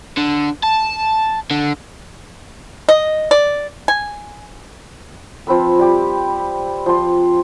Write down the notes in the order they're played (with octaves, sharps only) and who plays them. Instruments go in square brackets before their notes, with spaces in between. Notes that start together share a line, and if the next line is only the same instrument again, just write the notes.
[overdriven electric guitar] D3
A5
D3
[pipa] D#5
D5
G#5
[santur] F3 C4 B4 E6
G3 G4
F3 C6